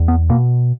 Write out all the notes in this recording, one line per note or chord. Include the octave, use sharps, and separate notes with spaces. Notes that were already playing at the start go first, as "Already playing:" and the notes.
Already playing: E2
B3
B2 A#3